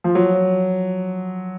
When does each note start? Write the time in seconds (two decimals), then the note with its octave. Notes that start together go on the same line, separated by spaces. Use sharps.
0.04 F3
0.15 F#3